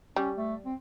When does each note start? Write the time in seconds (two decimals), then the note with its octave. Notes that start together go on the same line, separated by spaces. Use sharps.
0.16 G3 C#4
0.37 A3
0.65 C4